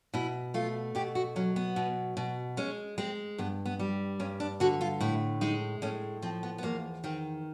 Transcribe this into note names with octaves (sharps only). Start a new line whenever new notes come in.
B2 E4
A3 F4
B2 G4
F#4
F#3 C#4
B3
B2
B2
G#3 C#4
G#3 C4
G2 B3
B3
G3
G2 C#4
D4
D3 F#4
F4
A2 E4
G#3 D#4
A2 C#4
F3 C4
B3
B3
E2 A#3
D#3 C4